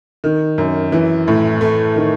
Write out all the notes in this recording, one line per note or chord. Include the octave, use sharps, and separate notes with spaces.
D#3
F#2
E3
A2
A3
D#3